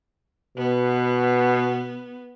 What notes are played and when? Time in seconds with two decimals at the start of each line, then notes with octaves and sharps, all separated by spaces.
0.58 B2 B3